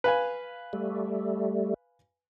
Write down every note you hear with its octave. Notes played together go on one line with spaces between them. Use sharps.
B4 F5 G#5
G3 A3